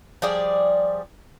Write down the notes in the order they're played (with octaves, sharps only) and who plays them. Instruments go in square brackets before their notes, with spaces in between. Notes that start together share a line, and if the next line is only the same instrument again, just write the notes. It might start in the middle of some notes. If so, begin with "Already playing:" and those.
[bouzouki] F3 G3 G#4 D5